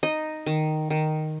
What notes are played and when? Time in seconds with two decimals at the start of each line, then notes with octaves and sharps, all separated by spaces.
0.03 D#4 D#5
0.46 D#3
0.90 D#3